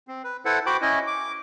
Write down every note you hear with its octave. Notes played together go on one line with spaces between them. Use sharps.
C4
B4
E4 A4 B4 C5 F#5
F#4 C5 G5 B5 D6
C#4 E4 D#5
D6